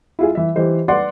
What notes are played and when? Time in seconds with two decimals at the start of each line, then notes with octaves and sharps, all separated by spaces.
0.19 E4 F4 G#4
0.35 E3 E5
0.55 E3 G4 C5 D#5
0.88 B4 D5 F#5 C6